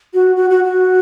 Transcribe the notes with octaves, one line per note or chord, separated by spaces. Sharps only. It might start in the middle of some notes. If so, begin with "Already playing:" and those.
F#4
F#4
F#4
F#4